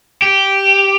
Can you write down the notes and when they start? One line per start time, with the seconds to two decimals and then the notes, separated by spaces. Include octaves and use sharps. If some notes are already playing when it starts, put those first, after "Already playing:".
0.22 G4